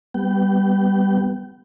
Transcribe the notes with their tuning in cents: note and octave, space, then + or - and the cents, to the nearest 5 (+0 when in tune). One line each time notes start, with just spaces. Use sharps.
G3 +0 B3 +0 G5 -30